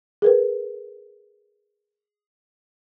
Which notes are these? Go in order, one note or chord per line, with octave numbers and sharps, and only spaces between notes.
G#4 A#4 B4